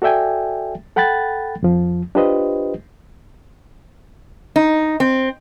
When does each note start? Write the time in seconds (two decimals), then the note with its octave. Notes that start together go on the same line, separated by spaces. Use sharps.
0.02 F#4 A4 D5 E5 G5 G#5
0.96 A4 F#5 G5 B5 F#6 A6
1.63 F2 F3
2.15 D4 F4 G4 B4 C5 D#5
4.56 D#4
5.00 C4